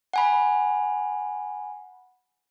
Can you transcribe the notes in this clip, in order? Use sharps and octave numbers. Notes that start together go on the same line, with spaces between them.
F#5 G#5 B5